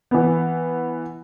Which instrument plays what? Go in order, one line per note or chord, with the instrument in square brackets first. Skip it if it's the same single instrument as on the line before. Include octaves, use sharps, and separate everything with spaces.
[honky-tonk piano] E3 B3